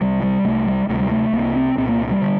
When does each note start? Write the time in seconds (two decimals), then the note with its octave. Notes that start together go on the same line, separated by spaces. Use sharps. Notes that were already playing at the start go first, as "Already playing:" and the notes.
0.01 C2 C3 G3
0.23 G3
0.45 C2 C3 A3
0.66 G3
0.89 D2 C3 A3
1.00 G3
1.11 A3
1.33 C2 C3 A#3
1.56 C4
1.77 C2 A#2 C4
1.89 A#3
2.11 G3
2.21 D3